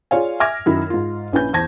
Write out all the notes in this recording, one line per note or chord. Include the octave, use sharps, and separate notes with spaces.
F4 G#4 C#5 D5 F5 G#5
E5 G#5 D6 F6 G#6 A#6
F#2 D#3 E4
G#2 F4
A#1 C#4 E4 B4 G#5 G6
E2 C5 A5 G#6 A#6